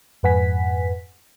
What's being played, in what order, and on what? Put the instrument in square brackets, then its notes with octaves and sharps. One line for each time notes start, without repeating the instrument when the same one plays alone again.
[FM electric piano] F2 G#2 B4 F#5 G#5 B6